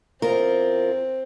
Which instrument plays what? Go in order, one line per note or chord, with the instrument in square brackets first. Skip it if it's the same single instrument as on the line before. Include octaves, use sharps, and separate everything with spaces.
[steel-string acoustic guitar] E2 F4 A#4 [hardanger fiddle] C4